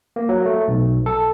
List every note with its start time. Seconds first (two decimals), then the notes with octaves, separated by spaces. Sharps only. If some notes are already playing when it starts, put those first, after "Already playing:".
0.16 A#3
0.29 F#3
0.46 A3
0.68 B1
1.06 A4